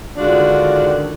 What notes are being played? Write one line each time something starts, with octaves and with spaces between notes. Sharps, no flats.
D3 D#3 G#3 D4 F4 F#4